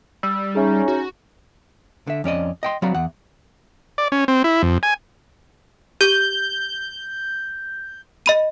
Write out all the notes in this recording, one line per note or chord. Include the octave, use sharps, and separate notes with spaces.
G3 E6
C#4 D#4 G#4 E5
F#4
D3 E5
F2 C#4 D5 D#5
D#5 G5 C6
F#3 C4 F#4 D5 F5 B5
E2 F#5
D5
C#4
C4
E4
F2
G#5
G4 G6
D#5 B5 D#7